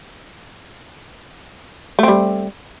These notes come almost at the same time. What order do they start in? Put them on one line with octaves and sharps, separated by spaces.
A3 C4 G3